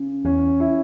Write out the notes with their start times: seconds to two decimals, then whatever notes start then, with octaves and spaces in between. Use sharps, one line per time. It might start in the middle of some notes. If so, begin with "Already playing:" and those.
Already playing: C#3
0.24 E2 C#4
0.60 E4